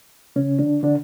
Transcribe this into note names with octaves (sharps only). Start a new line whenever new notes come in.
C#3 C#4
D3 D4
D3 D4